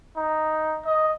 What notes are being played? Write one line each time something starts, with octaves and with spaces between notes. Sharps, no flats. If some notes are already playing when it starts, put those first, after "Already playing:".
D#4
D#5